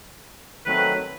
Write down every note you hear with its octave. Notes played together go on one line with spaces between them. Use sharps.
D#3 F#3 A3 C4 B4